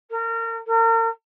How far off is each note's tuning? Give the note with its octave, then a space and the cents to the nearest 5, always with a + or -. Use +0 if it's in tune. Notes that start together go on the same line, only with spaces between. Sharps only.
A#4 -30
A#4 -40